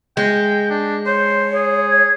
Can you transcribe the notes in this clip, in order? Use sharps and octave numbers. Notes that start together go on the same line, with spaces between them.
G#3 G5
D4
C5 C#5
G#4
G#6